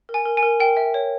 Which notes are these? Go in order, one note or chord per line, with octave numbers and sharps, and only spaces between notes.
A#4
G#5
A#4
G#5
A#4
A#4 G5
E5
C#5